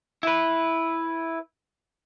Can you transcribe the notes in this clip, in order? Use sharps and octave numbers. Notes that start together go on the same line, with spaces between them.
E4 B4